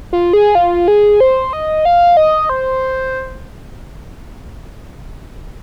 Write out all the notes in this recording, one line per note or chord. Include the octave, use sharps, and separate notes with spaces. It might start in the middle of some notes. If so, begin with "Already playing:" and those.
F4
G#4
F4
G#4
C5
D#5
F5
D#5
C5